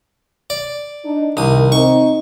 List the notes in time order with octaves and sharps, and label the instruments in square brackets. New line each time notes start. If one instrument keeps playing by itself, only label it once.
[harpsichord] D5
[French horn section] D4 D#4
[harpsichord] C2 D#6 [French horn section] D#3 A#4
[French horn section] C4 D#4 [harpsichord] C#6